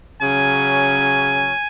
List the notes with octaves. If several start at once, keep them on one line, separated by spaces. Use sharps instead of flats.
C#3 F#3 C#4 G#5